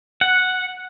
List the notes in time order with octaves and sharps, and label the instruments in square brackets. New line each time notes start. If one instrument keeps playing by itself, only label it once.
[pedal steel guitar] F#5